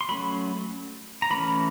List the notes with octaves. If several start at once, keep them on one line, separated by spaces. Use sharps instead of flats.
C6
F#3 A3 C#4 B5
A#5
E3 A3 C#4 B5